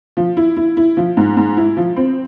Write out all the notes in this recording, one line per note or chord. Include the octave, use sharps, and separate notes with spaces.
F3
E4
E4
E4
F3
G#2
G#2
E4
F3
C4